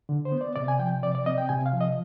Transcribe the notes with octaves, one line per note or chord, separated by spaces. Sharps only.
D3
C5
B3
D5
C3 D5
G#5
F3 G5
C3 D5
D5
C4 D#5
G5
C3 G#5
F5
F3
D#5